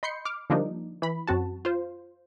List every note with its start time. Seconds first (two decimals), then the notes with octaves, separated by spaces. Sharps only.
0.03 D#5 B5 C6 G6 C7 C#7
0.25 D6 F6
0.50 D3 F3 G3 A#3 D4 D#4
1.02 E3 B5
1.28 F#2 C4 F#4 A5
1.65 F4 C5